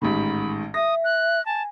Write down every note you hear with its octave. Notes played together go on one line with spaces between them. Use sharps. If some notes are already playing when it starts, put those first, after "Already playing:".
A1 G#2 D#3 B5
E5 D#6 A#6
F#6
G#5 A5